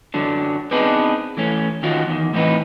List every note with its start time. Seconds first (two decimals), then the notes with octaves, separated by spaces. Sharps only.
0.14 F#2 D3 F#3 D4
0.71 B3 C4 D4 D#4 G#4 B4
1.37 E3 A3 C#4
1.83 D#3 C#4 F4 F#4
2.07 E2 D#3
2.33 A2 E3 C4 D4 D#4 B4